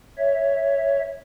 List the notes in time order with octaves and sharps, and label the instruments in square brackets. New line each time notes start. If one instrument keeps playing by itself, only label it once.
[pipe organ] C#5 E5